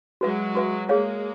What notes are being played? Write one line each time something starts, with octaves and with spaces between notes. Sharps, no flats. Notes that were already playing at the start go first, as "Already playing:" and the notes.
F#3 G#3 F#4 B4 E5
F#4 B4 E5
G#3 A#3 G#4 C#5 F5